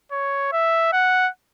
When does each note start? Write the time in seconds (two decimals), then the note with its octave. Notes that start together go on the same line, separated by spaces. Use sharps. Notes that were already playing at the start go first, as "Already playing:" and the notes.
0.12 C#5
0.52 E5
0.93 F#5